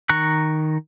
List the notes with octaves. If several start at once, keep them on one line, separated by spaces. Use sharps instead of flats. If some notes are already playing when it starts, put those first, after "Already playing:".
D#3 A#5 C#6 F#6